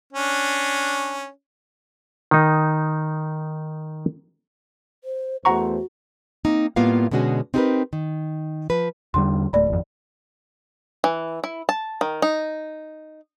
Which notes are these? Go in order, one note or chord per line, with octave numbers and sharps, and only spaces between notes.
C#4 D4
D#3 D#4
C5
E2 A3 F#4 C5 F#5 A#5 C#6
A#3 C4 D#4
A2 G3 A#3 B3 F4 F5
B2 D3 G#3 C#4 F#4 G#4
C4 D#4 G4 G#4 A#4 B4
D#3
F3 B4
E2 D3 G3 C6
D1 A3 D5 B5
G#1 F2
E3
E4
A5
D#3
D#4